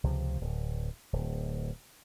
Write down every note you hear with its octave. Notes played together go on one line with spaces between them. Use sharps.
C#2 C3 F3
D1
D1